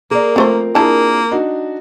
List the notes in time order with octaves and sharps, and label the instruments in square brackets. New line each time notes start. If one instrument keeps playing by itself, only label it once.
[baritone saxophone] A#3 [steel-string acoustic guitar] G#4 A#4 D5
[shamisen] F3 A3 C5 [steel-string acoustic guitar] C4 F4 A#4
[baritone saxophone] A#3 [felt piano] D4 G#4 [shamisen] E4 A5
[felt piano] D4 D#4 F#4